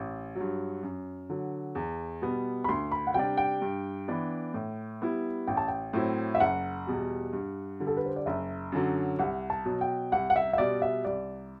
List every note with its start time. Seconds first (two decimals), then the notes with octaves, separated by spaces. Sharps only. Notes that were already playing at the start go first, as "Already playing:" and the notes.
Already playing: A1
0.35 F#3
0.40 G2
0.83 F#2
1.29 D3 F#3
1.75 E2
2.22 B2 G3 B3
2.64 B5
2.69 D2 C6
2.92 B5
3.07 F#5
3.14 C3 G3 D4 G5
3.37 G5
3.62 G2
4.08 E3 B3 D4
4.54 A2
5.01 G3 B3 E4
5.47 A1 G5
5.57 A5
5.68 G5
5.93 A2 F#3 C4 E4
6.35 E5
6.40 F#1 F#5
6.87 E2 B2 G3
7.33 G2
7.80 D3 G3
7.87 A4
7.97 B4
8.06 C5
8.16 D5
8.26 F#1 E5
8.72 F#2 D3 F#3
9.19 C2 F#5
9.50 A5
9.65 B2 F#3
9.81 G5
10.12 C2 F#5
10.30 F#5
10.36 E5
10.53 E5
10.58 B2 G3 D5
10.82 E5
11.05 C2 D5